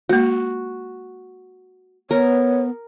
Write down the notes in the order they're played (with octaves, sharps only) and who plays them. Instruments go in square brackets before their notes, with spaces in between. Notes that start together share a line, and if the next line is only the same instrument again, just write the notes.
[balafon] G#3 A#3 [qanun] F#4
[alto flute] B3 [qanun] A#4 [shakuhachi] C#5